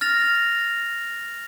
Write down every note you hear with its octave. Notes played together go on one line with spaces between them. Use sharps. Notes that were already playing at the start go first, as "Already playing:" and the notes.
F6 A6 A#6 F7